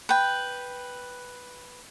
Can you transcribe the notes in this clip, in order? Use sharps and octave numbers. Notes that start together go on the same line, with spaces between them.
B4 G5